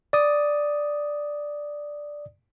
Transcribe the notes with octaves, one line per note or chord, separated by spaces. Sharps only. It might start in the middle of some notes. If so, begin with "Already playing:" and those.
D5 D#6